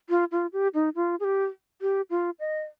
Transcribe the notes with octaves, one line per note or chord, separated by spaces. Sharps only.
F4
F4
G4
D#4
F4
G#4
G4
G4
F4
D#5